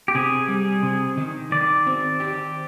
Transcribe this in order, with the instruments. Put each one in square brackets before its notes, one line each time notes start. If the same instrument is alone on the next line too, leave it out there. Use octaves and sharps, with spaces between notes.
[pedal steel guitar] G4
[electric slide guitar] C3 [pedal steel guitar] G#4
[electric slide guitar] G3
C3
D#3
[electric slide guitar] D#3 [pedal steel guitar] D5
[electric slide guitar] C4
G4